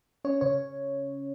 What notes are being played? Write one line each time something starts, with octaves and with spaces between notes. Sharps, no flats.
C#4 C#5
C#3 C#5